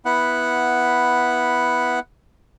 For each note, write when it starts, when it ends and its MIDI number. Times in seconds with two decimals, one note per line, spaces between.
0.05 1.99 59
0.05 1.99 64
0.05 1.99 78